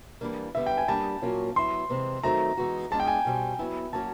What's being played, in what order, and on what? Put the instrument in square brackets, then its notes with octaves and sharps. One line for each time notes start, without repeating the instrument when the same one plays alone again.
[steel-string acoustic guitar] E3 G3 A#3 D4
[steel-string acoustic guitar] D3 G3 B3 [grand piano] E5
[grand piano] G5
G#5
[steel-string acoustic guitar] G3 A#3 D4 [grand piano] A5
[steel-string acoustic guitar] A#2 F#3 A#3 C#4 F4
[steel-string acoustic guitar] F#3 B3 E4 [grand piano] C6
[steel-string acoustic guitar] C3 E3 G#3 C4
[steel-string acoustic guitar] D#3 F#3 A3 C4 D#4 [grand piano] A#5
[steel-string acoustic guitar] E3 G#3 B3 D#4 F#4
[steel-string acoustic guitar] G#3 B3 D4 F4 G#4 [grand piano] A5
[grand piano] G5
G#5
[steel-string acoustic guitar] B2 G3 C4
F#3 B3 E4
[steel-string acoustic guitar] F#3 A#3 C#4 F#4 [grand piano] A5